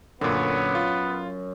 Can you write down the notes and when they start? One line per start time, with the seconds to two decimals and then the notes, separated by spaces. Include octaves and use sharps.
0.21 F#2 A#2 D3 B3
0.75 F4